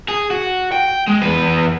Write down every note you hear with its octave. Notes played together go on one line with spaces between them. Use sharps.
G#4
F#4
G5
G#3
E2 B4